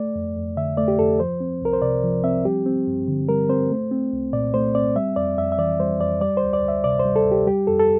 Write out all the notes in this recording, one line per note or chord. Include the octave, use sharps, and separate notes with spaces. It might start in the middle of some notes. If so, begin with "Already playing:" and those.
Already playing: A3 D5
F2
F2
D3 E5
A3 D5
G4
F2 A4
F3 C5
C4
C2 A#4
C5
C3 D5
F3
C4 E5
G3 G4
C4
G2
D3
G3 A#4
C4 C5
A3
C4
C2
A#2 D5
A3 C5
C4 D5
G3 E5
F2 D5
F2 E5
E5
E3 D5
G3 C5
F2 D5
G3 D5
C5
D2
D5
D2
E5
C3 D5
C5
G3
A4
D2
G4
G3 G4
F2 A4
A4